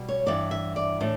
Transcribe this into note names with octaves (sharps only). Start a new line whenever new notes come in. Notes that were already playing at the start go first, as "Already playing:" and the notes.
Already playing: B2 G3
C#5
G2 E3 B3 D4 D5
E5
D5
A2 E3 A3 D4